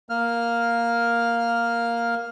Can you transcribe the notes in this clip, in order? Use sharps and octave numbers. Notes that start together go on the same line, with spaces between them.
A#3 F6